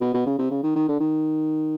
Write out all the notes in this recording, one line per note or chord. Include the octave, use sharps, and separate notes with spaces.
B2
B2
C#3
C3
C#3
D#3
D#3
D3
D#3